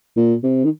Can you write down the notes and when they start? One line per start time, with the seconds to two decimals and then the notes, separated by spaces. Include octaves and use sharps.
0.17 A#2
0.43 C3
0.65 D#3